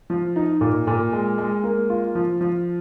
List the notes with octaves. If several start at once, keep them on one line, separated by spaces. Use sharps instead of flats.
F3
D#4
A#2
A#2
G#3
G#3
A#3
F4
F3
F3